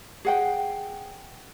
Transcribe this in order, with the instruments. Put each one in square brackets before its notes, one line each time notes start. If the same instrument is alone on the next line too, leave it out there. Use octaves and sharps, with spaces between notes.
[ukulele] G#4 F#5 G5